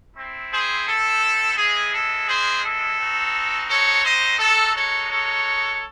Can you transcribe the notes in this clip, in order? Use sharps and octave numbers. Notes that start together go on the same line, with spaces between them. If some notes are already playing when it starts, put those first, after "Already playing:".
C4 E4
G#4 C5
A4
G#3 C4 E4 G#4
A4
G#4 C5
A4
C4 D#4 F#4
A4 C#5
C5 D#5
G#3 D#4 F#4 A4
A4 C#5
A4 C#5